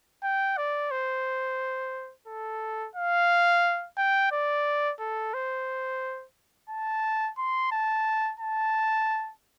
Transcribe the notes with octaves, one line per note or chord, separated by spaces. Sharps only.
G5
D5
C5
A4
F5
G5
D5
A4
C5
A5
C6
A5
A5